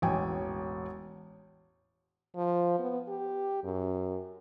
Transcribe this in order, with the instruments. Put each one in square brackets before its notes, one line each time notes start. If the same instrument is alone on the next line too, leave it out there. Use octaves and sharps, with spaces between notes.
[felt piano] E1 A1 G5 G#5
[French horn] F3
B3
G4
F#2